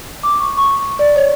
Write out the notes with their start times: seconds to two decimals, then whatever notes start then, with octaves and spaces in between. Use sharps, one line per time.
0.23 D6
0.40 C#6
0.57 C#6
0.99 D5
1.16 C#5